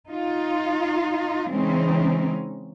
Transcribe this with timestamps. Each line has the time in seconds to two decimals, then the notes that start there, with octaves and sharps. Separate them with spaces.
0.11 D#4 F4
1.49 C#3 E3 G#3 C4 C#4 D#4